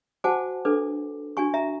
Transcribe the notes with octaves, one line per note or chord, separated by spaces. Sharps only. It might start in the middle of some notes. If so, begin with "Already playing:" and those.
F#4 C5 F#5 G#5 A5 D6
D4 A4 B4 D6
D4 F#4 G#5 C#6
E5 A#5